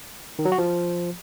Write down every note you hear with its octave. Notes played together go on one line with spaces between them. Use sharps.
D#3
F#3
F#4
F3